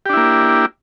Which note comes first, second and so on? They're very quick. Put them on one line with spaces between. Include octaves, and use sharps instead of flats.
G4 D4 E4 A#3